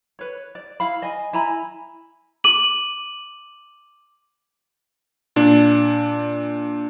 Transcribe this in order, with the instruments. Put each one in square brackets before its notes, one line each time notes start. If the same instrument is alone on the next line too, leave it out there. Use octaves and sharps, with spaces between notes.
[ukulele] B4 C#5
D5
E4 F5 B5
D#5 G#5
E4 G#5 A#5 B5
[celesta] D6 D#7 F#7
[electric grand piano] A#2 D4